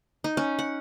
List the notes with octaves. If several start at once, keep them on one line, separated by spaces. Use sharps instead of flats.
D#4
C#4
F#5